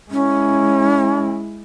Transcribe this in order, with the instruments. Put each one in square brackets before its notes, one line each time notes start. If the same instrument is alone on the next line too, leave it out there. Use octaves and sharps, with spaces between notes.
[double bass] G#3 E4 [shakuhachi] C#4